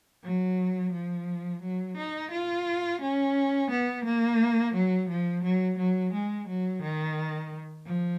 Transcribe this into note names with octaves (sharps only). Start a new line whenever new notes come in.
F#3
F3
F#3
D#4
F4
C#4
B3
A#3
F#3
F3
F#3
F#3
G#3
F#3
D#3
F3